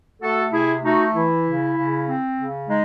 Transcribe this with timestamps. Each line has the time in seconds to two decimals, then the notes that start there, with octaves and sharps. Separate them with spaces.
0.21 A3 F#4 A4
0.52 C3 E4 G#4
0.83 A3 D#4 F#4
1.14 E3 E4
1.46 C#3
1.77 C#3
2.07 C4
2.39 C#3
2.68 G#3 D#4